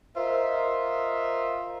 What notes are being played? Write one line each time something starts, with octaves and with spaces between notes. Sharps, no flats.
F4 A#4 C5 D#5 E5